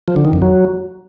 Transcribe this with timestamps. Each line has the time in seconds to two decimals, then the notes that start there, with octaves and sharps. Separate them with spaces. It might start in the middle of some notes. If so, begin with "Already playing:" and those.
0.08 F3
0.16 D3
0.25 D#3
0.33 F2
0.42 F#3